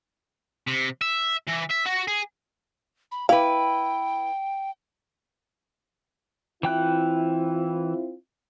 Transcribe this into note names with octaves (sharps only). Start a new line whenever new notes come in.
C3
E5
E3
E5
F#4
G#4
B5
E4 B4 F5 G5
E3 C4 E4 F4 G5 F#6